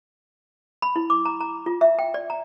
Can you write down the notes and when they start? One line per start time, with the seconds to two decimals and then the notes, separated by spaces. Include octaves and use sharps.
0.82 B5
0.96 E4
1.10 D6
1.25 A#5
1.41 A#5
1.66 F4
1.81 E5
1.99 G5
2.14 D5
2.30 A#5